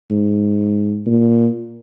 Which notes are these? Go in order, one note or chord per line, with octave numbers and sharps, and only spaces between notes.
G#2
A#2